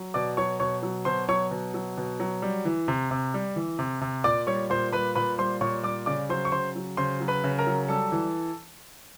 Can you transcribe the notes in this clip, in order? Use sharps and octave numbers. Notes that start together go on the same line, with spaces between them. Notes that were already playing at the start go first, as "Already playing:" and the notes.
Already playing: F#3
B2 D5 D6
F#3 C#5 C#6
B2 C#5 C#6
F#3
B2 C5 C6
F#3 C#5 C#6
B2
F#3
B2
F#3
G3
E3
C3
C3
G3
E3
C3
C3
A#2 D5 D6
G3 C#5 C#6
A#2 C5 C6
G3 B4 B5
A#2 B4 B5
G3 C5 C6
A#2 C#5 C#6
G3 D5 D6
C#3 D5 D6
F#3 C5 C6
C#6
C#3 C5 C6
F#3
C#3 C5 C6
F#3
B4 B5
C#3
A#4 A#5
F#3
G3 A4 A5
E3